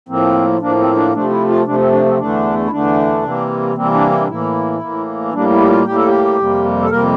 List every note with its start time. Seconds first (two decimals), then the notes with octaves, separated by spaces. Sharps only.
0.09 A2 F3 A#3 C4
0.60 A2 F3 A#3 D4
0.78 C4
0.95 D4
1.14 C3 F3 A3 D4
1.30 E4
1.49 F4
1.66 C3 F3 A3 D4
1.79 C4
1.92 D4
2.06 C4
2.18 E2 D3 A3 D4
2.65 E4
2.70 E2 D3 A3 D4
3.23 C3 E3 G3 A#3
3.75 C3 E3 G3 A#3 C4
3.94 D4
4.11 E4
4.20 D4
4.28 A2 E3 A#3 E4
4.81 A2 E3 A#3
5.33 A2 G3 A#3 D4
5.51 E4
5.61 G4
5.68 F4
5.85 A2 G3 A#3 G4
5.96 A4
6.07 G4
6.38 F2 C3 G3 A#3
6.83 A4
6.90 F2 C3 G3 A#3 A#4